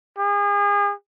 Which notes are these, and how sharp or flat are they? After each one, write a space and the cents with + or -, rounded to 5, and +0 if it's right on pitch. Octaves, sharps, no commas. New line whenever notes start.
G#4 -35